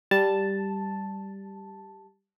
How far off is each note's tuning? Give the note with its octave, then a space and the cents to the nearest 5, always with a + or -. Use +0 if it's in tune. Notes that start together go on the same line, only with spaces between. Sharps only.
G3 +0 A5 +0